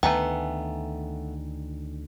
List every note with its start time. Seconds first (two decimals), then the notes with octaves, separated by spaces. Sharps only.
0.03 D2 D#3 A3 B3 G5 G#5 A#5